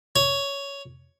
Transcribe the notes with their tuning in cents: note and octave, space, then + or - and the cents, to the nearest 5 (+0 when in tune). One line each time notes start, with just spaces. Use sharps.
C#5 +10